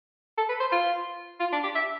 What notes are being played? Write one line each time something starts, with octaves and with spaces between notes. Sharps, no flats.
A4
B4
C5
F4
F4
D4
G4
E5